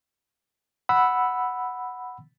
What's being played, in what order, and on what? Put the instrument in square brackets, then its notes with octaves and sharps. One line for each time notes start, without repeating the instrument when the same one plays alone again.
[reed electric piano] F#5 B5 E6